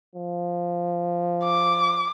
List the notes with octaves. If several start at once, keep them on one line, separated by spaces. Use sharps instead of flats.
F3
D6